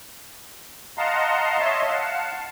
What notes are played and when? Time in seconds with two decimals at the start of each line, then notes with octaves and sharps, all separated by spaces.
0.98 D#5 F5 F#5 A5 A#5 C6
1.60 C#5 D#5 E5 A5 C6
1.87 F5 F#5 A5